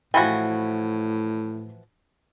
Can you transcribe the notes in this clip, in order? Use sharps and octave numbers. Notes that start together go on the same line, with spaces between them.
A2 E3 F3 F#4 G5 G#5 B5